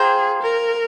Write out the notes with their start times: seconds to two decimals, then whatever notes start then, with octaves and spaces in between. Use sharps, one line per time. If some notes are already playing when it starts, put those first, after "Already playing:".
Already playing: F4 G#4 C5 G5 A#5
0.42 A#4